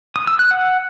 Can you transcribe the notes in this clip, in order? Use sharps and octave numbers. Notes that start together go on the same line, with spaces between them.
D#6
E6
F#6
F#5